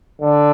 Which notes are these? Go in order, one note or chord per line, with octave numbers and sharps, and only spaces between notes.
D3